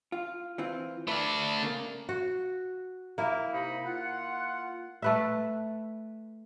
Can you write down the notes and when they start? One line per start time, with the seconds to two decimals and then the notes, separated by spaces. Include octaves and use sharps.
0.12 F4
0.58 E3 C4 F4
1.08 A3 B4 D5
1.63 C#3 A#3
2.09 F#4
3.18 A#3 E4
3.53 C3 D#4 B5
3.85 F4 F#5
5.02 A3 B4 E5